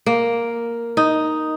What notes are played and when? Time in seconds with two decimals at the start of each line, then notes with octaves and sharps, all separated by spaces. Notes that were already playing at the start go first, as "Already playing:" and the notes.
0.06 A#3
0.97 D#4